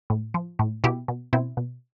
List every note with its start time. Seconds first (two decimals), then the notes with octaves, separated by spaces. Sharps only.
0.10 A2
0.34 F3
0.59 A2
0.84 B2 E4 G4
1.08 B2
1.33 B2 C4 E4
1.57 B2